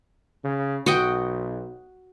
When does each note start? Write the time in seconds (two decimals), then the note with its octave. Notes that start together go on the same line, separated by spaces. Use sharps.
0.44 C#3
0.86 B1 F#4 D#5 G5